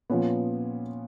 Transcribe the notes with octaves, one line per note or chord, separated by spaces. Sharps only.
A#2 F3 B3 C#4